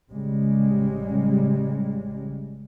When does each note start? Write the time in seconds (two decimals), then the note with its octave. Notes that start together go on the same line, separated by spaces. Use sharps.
0.10 A1 C#3 G3 G#3